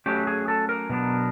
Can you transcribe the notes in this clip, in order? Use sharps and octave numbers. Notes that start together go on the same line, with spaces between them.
F#3 A3 C#4 G4
G#4
A4
A#4
B2 F#3 B3 D4